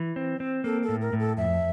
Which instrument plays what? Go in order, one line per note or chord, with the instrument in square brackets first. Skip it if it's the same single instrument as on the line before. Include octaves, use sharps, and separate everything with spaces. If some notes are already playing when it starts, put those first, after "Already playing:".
Already playing: [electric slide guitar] E3
C4
C4
[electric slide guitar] A#3 [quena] A4
[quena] A4
[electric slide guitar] A2
[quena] A#4
[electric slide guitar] A2
[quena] A4
[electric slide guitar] F2 [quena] E5